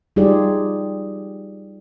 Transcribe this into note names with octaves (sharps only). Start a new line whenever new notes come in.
G3 D#4 F4 G4 G#4 D5